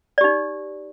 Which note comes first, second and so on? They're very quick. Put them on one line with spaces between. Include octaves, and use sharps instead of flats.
D5 G4 D#4